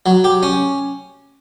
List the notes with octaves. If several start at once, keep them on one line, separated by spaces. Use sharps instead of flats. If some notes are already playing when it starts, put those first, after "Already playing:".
F#3
G4
C#4